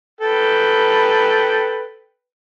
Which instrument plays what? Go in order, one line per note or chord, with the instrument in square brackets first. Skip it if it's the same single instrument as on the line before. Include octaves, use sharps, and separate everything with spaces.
[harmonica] A4 B4 G5